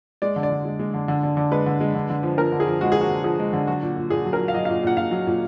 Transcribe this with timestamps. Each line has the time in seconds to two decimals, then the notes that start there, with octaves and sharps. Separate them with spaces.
0.22 G#3 D5
0.36 D3
0.43 D5
0.50 D3
0.65 G#3
0.79 G#3
0.94 D3
1.08 D3
1.23 D3
1.37 D3
1.51 G#3 B4
1.66 D3
1.80 G#3
1.94 D3
2.10 D3
2.23 F3
2.38 F3 A#4
2.52 D3
2.60 G#4
2.66 F3
2.81 G#3 F#4
2.92 F3 G#4
3.01 F#4
3.09 D3
3.24 F3 G#4
3.39 G#3
3.53 D3
3.67 F#3 F#4
3.83 A#2
3.96 A#2
4.10 A#2 G#4
4.25 F#3
4.33 A#4
4.39 F#3
4.48 F5
4.54 F#3 D#5
4.65 F5
4.69 A#2
4.83 A#2 F#5
4.97 A#2 F5
5.11 F#3
5.27 A#2